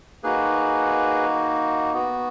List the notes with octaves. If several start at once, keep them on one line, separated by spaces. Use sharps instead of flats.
A#3 D#4 F#4 G#4 B4
B3 F#4